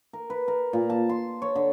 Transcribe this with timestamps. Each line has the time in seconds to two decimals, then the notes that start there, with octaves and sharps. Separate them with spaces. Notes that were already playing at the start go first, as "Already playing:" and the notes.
0.13 A#4
0.30 B4
0.48 A#4
0.73 A#2
0.90 A5
1.09 C6
1.42 C#5
1.56 D3